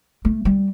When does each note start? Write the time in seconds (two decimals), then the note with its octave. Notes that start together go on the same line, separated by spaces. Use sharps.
0.25 A3
0.45 G3